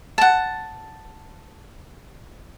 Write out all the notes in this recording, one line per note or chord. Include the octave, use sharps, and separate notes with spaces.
F#5 A5